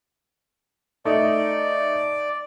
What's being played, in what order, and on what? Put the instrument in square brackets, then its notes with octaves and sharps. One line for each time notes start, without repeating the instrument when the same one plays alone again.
[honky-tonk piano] A3 D#4 [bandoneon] D5